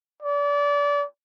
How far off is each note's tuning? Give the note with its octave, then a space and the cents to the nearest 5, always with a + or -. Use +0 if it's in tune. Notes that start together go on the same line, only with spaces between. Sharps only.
D5 -30